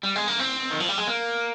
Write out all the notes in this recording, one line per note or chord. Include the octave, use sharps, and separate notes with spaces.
G3
G#3
A#3
C4
D#3
F3
G3
G#3
A#3